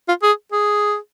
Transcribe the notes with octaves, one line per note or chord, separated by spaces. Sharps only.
F4
G#4
G#4